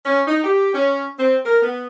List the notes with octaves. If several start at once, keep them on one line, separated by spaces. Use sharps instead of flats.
C#4
D#4
G4
C#4
C4
A#4
B3